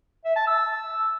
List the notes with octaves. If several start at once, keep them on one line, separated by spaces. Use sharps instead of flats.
E5
A5
E6